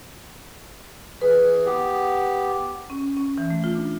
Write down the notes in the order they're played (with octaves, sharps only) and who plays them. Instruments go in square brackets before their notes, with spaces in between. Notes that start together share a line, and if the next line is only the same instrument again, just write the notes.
[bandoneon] E3 G#4 [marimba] B4
[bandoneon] B3 G4
[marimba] C#4
C#4
E3
A3
F4
D4